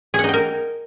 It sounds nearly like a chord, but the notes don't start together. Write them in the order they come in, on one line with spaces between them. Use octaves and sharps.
G#4 F#5 D#4 G5 A#4